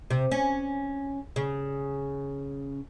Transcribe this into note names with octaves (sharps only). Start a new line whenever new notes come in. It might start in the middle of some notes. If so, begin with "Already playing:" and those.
C3
C#4
C#3